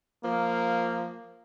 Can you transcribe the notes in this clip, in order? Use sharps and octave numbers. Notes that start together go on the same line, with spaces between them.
F3 A#3